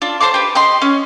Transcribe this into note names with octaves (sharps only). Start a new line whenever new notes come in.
D4 F4
C5 A5 C6 D6
G4 B4
G4 D#5 C6
C#4